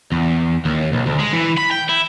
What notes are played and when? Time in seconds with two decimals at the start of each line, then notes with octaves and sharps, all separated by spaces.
0.12 E2
0.65 D#2
0.93 B1
1.06 D2
1.19 G#3
1.33 E3
1.58 B5
1.71 G5
1.89 E4